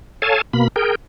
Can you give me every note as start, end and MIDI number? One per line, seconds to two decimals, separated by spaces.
0.22 0.41 69
0.22 0.41 73
0.22 0.41 77
0.22 0.41 80
0.22 0.41 81
0.53 0.68 47
0.53 0.68 58
0.53 0.68 83
0.76 0.95 68
0.76 0.95 70
0.76 0.95 79